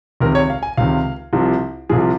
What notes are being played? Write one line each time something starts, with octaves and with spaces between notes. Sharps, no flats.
C#2 C3 D#3 A#4
C#5
F5
G#5
C#2 C3 D#3 F5
C2 C3 F3
C2 C3 F3 G#4